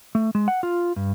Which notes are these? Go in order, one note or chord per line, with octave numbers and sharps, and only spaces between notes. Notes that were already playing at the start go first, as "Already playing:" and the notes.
A3
G#3
F#5
F4
G2